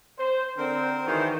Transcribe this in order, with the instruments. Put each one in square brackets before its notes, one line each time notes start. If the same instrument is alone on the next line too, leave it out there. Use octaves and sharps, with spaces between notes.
[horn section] C5
[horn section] D3 C4 [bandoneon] A#4 C5
[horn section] G#2 D#3 F#4 [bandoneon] E3 C5